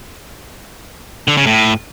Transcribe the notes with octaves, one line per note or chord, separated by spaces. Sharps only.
D3
C#3
A2